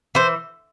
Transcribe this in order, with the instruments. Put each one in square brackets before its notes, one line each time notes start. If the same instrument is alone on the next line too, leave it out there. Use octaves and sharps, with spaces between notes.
[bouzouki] E3 C5